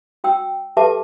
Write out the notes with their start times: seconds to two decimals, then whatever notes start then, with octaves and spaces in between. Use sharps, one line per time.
0.24 F#4 G5 E6
0.77 G4 A4 B4 E5 A5 D6